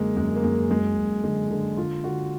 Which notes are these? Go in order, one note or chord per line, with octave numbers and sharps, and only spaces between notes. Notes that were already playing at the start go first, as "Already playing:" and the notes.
Already playing: F#2 D3 G#3 A#3
F#2 G#3
A#3
F#2 G#3
F#2 G#3
F#2
D3 G#3
D3
D3 F4
D3 F#4